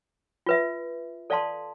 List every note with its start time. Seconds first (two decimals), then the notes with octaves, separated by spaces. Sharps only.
0.46 F4 B4 E5
1.30 A4 D5 F5 A5 C6